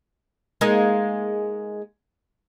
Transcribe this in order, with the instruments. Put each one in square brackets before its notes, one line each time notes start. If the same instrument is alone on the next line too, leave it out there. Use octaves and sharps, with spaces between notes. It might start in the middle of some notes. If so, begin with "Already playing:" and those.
[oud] G#3 A#3 D#4